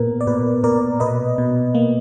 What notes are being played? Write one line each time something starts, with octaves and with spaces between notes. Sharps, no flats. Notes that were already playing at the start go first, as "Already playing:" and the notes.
Already playing: A#2 B3 A#4
D5
A#2 B4
A#2 A#4 D5
B2 B4 D#5
B2
A#3